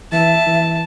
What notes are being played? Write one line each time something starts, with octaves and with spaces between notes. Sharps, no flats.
E3 E5 A5
E3